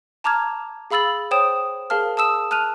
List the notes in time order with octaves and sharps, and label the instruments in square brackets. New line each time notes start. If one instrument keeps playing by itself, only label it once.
[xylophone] A5 A#5 D6 F6 G#6
G#4 F5 B5 E6 A6 F#7
C5 C#5 G5 D#6 E7
G#4 A#4 F5 A5 F6
A5 D#6 E6 E7
A5 F6 F#6 D#7 F7